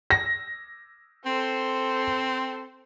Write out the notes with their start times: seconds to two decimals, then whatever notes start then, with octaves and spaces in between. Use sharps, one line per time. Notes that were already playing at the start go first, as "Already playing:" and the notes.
0.10 A#6
1.26 C4 A4 C5